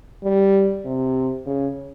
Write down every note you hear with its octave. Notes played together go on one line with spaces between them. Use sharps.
G3
C3
C#3